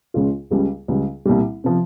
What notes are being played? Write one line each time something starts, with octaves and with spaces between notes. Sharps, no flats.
C#2 C#3 G#3 C#4 F4
C#2 C#3 G3
C#2 C#3 G3
C2 A#2 G3
C3 F3